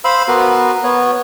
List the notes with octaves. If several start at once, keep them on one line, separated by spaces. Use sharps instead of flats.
C5 F5 B5 E6
B3 F#4 A#4 B4
B3 C#5